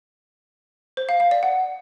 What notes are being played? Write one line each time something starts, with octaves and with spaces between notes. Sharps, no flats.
C5
F5
F5
D5
F#5